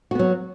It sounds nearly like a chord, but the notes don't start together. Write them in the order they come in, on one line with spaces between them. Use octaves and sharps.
F#4 B3 F#3